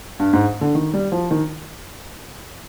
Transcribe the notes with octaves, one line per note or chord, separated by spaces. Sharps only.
G2
G#2
D3
D#3
G3
F3
D#3